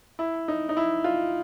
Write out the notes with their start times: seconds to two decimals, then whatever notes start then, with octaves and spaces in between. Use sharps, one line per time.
0.19 E4
0.48 D#4
0.69 D#4
0.77 E4
1.04 F4